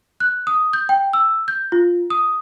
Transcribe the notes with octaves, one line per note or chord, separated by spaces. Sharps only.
F#6
D#6
G6
G5
E6
G6
F4
D#6